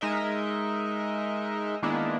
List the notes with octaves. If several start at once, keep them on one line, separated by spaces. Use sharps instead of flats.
G#3 D#4 A#4 D#5 E5
D#3 G#3 A#3 B3 D4 E4